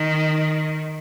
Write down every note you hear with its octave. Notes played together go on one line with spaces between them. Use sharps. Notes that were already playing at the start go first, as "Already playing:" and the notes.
Already playing: D#3